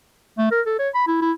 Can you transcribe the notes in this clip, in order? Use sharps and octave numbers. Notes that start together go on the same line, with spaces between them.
A3
A#4
A4
C#5
B5
E4
E4